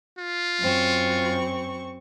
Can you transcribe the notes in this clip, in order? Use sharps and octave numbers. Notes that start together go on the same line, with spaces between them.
F4
F#2 C4 C#6